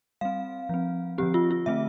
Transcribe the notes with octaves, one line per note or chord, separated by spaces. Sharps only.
G3 C4 F5
F3 C4
D3 F3 C4 G4
F4
F4
D3 A3 C4 E5